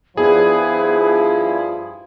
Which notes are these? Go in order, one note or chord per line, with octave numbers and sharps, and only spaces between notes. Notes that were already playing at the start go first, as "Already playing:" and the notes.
G2 F3 B3 E4 G#4